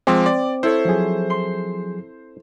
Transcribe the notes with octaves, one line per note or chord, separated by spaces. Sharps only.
F3 G#3 C4 D6
D5
E4 A4 C5 C#5
F3 F#3 G#4
C6